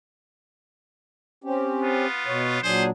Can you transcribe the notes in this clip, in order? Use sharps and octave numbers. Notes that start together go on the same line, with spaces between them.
C4 C#4 G4
B3 F4
B2 C#5
A#2 F#3 D4 G#4 C5